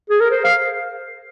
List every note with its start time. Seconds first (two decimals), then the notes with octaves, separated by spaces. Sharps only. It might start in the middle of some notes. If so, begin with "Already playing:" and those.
0.10 G#4
0.20 A#4
0.31 C5
0.44 F5